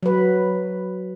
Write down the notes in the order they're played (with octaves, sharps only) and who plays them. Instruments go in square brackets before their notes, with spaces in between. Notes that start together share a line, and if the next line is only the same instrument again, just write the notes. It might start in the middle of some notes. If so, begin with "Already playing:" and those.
[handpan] F#3 B4